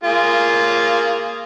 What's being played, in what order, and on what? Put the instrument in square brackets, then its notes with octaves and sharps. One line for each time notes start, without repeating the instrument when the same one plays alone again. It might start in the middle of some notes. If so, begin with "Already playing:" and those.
[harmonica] A#3 F4 G#4